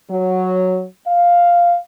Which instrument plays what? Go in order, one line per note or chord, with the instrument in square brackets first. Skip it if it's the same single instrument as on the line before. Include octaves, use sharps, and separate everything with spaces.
[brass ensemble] F#3
F5